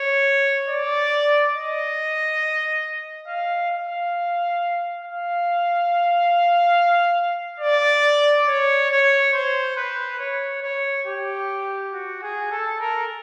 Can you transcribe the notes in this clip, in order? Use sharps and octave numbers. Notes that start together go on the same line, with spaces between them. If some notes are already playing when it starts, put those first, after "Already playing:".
Already playing: C#5
D5
D#5
F5
F5
F5
D5
C#5
C#5
C5
B4
C#5
C#5
G4
F#4
G#4
A4
A#4